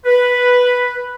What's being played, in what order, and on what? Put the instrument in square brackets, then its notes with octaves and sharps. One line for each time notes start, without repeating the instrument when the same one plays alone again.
[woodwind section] B4